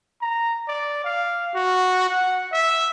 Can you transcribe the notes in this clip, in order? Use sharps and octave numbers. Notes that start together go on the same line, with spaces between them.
A#5
D5
F5
F#4
F#5
E5